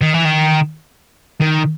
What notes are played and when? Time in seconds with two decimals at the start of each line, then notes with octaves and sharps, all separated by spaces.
0.01 D#3
0.14 E3
0.25 D#3
1.41 D#3